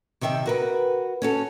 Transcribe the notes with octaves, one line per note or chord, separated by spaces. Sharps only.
C3 D#3 E5 F5 G5
F#4 A#4 B4
C#4 F#4 A4